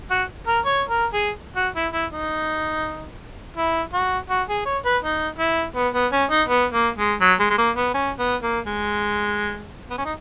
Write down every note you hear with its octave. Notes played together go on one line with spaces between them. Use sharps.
F#4
A#4
C#5
A#4
G#4
F#4
E4
E4
D#4
E4
F#4
F#4
G#4
C#5
B4
D#4
E4
B3
B3
C#4
D#4
B3
A#3
G#3
F#3
G#3
G#3
A#3
B3
C#4
B3
A#3
G#3
B3
C#4
D#4